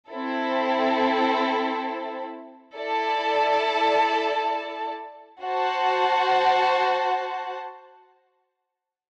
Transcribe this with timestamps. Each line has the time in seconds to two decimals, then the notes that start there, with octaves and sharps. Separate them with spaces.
0.10 C4 E4 A4
2.76 E4 A4 D5 A5
5.42 F#4 C5 F#5 A5